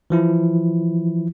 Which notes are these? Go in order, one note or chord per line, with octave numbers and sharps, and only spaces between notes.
E3 F3 E4